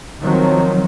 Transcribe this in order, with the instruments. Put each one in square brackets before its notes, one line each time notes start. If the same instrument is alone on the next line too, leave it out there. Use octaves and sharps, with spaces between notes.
[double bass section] D#3 F3 F#3 C4